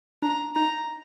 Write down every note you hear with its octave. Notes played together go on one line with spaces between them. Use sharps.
D4 A#5
D#4 A#5